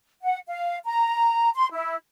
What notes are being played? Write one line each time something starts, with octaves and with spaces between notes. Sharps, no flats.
F#5
F5
A#5
C6
E4